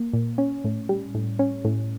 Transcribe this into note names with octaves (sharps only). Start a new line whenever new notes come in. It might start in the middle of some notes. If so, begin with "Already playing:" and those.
Already playing: A#3
A#2
C#4
A2
G3
A2
C#4
A2